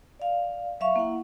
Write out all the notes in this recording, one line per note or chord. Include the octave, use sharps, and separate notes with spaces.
D5 F5
F#3 E5 F5 C#6
A#3 E4 F#5